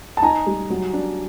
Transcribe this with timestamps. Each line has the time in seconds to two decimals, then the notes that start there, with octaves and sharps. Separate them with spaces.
0.17 A5
0.22 D#4 G#5 A#5
0.46 G3
0.70 F#3
0.93 D4